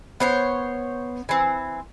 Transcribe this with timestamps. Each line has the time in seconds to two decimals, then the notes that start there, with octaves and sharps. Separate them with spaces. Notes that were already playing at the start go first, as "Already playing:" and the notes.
0.20 B3 C5 C#5
1.29 E3 C4